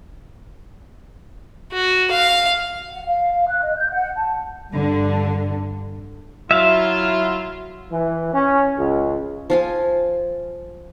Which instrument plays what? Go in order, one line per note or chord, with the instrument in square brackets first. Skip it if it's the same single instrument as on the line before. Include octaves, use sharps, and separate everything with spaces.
[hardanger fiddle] F#4
F5
[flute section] F#5
F5
F#6
D#5
G6
F#5
A5
[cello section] G2 D3
[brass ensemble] F#3 E4 F4 [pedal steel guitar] E5 F5
[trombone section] E3
C#4
C#2
[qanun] F3 F4 G#5